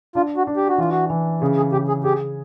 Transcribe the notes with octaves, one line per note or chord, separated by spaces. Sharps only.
D4 F4
F#4
D4
G4
F#4
E3 F4
F#4
E3
C#3 G#4
G#4
C#3 G4
G#4
G4 G#4